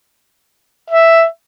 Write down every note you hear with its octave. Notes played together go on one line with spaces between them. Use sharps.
E5